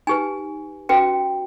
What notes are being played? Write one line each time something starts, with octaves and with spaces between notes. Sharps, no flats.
D#4 G4 B4 G#5
C#4 F#4 B4 G5